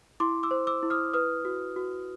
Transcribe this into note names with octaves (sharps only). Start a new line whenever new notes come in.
E4 C6 D6
D6 E6
C5
D6 E6
E4
D#6 F6
B4 D#6 F6
F#4
F#4